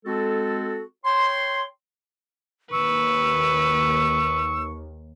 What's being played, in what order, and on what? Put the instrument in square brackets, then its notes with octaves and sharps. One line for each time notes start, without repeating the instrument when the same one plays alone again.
[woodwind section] G#3 C4 F#4 A4
C#5 G5 C6
[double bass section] D#2 [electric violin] B4 [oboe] C#6 [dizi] E6